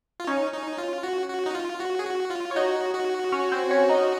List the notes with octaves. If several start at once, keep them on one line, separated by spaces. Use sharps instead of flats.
F4
C#4 D#4 C#5
D#4
F4
F#4
F#4
D#4
F4
F#4
G#4
F#4
F4
C#5
D#4 F#4 D#5
F#4
C#4 C#5
C4 C5
C#4 C#5
D#4 D#5